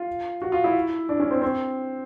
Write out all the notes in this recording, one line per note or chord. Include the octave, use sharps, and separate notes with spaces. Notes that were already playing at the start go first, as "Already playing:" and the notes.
Already playing: F4
F#4
F4
E4
D4
C#4
C4
C4